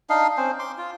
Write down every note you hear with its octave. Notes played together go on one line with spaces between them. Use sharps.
D4 D#4 D#5 F5
C4 C#4 C5
C6 D6
F4